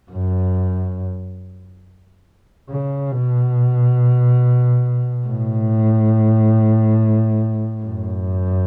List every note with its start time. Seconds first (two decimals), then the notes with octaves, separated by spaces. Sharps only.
0.11 F#2
2.69 C#3
3.12 B2
5.27 A2
7.84 F#2